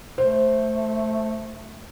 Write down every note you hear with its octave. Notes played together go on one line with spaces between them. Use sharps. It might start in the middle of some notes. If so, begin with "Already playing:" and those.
A3 C5